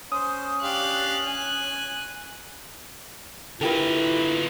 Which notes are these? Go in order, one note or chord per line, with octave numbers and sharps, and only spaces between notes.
C#4 C5 D#6
D4 G4 F5 F#6
G#5
D3 A#3 E4 F4 G4 A4 B4